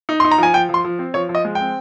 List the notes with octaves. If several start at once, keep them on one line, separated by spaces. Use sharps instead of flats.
D#4
D#4 C6
A#5
F3 G#5
F3 G5
F3 C6
F3
C4
F3 C#5
F3
D#5
G#3
G5
C4